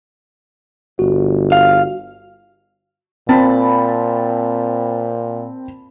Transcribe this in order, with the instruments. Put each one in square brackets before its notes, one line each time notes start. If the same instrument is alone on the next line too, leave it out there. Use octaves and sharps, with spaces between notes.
[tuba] G1 [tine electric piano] F#4
[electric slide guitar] F5
[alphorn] A#2 [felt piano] C4 [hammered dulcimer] A5 B5